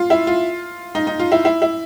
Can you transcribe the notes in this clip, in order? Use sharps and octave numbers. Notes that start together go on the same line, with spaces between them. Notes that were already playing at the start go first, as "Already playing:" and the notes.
Already playing: F4
E4
F4
D#4
D#4
F4
E4
E4
E4